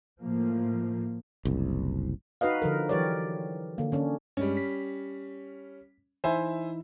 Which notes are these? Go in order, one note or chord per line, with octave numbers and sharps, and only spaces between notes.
A2 F3 A#3
F#1 C2
D#4 F#4 B4 D#5 F5
D3 F3 A#4
E3 F#3 G4 A#4 C#5 D5
D3 A#3
D3 C#4 D4
G2 G3 G#3 C#4
B6
E3 D#4 E4 C5 E5 G#5